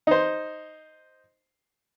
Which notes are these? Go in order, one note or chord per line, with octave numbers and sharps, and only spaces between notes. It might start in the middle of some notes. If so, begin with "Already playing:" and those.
D#4 C5